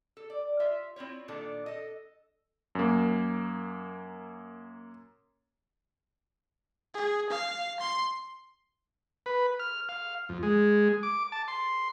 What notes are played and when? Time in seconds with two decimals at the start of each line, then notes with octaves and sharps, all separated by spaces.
0.17 A4
0.30 D5
0.60 F4 E5
0.96 C4 E4 F4 C#5
1.28 A#2 D#3 D4 A4
1.66 A4 D#5
2.75 F#2 A#3
6.94 G#4
7.30 F5
7.80 C6
9.26 B4
9.60 F6
9.89 F5
10.29 F2
10.43 G#3
11.03 D6
11.32 A5
11.48 C6